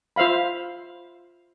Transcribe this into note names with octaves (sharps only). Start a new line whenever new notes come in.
F4 C5 E5 F5 B5